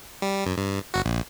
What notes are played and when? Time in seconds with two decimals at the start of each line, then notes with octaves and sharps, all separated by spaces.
0.22 G3
0.46 F#2
0.57 G2
0.94 G1 F#4
1.05 A#1